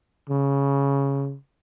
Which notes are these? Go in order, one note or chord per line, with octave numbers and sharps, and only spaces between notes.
C#3